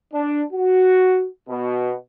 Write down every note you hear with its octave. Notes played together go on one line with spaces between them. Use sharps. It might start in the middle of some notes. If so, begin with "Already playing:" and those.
D4
F#4
B2